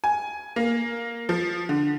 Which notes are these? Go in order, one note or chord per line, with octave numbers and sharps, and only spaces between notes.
G#5
A#3
F3
D3